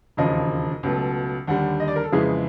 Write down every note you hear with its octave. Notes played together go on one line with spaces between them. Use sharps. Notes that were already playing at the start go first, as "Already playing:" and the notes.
E1 D#2 C#3 F3 D#5
C#2 B2 F#3 A3
D#2 D3 G3 F#5
D#5
D5
A#4
A4
F2 C#3 E3 G#3 G#4